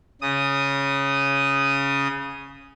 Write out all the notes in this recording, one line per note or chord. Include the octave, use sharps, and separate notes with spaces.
C#3 D#6